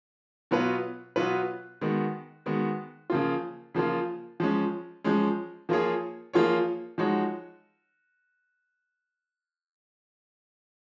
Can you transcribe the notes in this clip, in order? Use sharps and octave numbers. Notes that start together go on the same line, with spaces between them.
B2 F#3 B3 F4 B4
B2 F#3 B3 F4 B4
D#3 G#3 B3 F#4
D#3 G#3 B3 F#4
C#3 F3 A#3 F4
C#3 F3 A#3 F4
F3 G#3 C#4
F3 G#3 C#4
F3 A#3 F4 G#4 C#5
F3 A#3 F4 G#4 C#5
F3 G#3 D#4 F#4 C#5